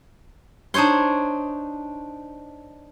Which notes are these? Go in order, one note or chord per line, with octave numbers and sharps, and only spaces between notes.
D4 D#4 C5 C#5 C6